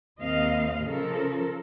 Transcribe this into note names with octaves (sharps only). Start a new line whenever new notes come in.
D#2 C4 D#5 F5
C#3 F3 A4 A#4